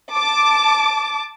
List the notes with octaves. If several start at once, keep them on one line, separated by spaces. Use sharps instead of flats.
A5 D6